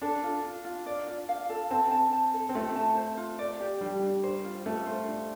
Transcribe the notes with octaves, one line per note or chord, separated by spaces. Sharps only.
D4 A4
F4
F4
F4
D5
F4
F5
A4
C4 A5
A5
A5
A4
C4
A3 F4
A5
C5
F4
D5
G4
G3 D4
D4
C5
F4
A3 F4
C5
D4